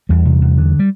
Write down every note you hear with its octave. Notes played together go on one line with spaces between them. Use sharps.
E2 G3
C3
E2
D3
G3